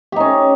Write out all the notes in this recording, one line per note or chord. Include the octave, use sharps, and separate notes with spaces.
C#4 D#4 G4